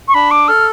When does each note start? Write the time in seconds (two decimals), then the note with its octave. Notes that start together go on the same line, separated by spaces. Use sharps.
0.08 C#6
0.14 D4 B5
0.31 D6
0.48 A4 F6